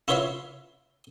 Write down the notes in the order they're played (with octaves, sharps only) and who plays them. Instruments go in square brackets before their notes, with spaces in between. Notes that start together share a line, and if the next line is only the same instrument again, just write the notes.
[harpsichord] E4 F4 B4 C#5 E5 F5